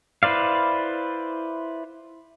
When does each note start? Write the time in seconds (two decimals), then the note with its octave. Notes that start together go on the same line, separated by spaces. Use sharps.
0.23 E4 B4 C5 D5 F5